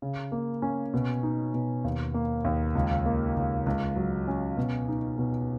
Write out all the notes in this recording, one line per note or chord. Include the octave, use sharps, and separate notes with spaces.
C#3
A#3
C#4
B2
D#4
B2
D#2
A#3
D#2
C#2
A#3
C#2
C#2
F#3
C#4
B2
D#4
B2